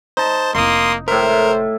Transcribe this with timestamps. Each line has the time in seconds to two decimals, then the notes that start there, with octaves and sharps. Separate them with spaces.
0.17 D#4 C5 A5
0.55 F1 A#3 E4 C6 D#6
1.08 A2 A#4 C5 E5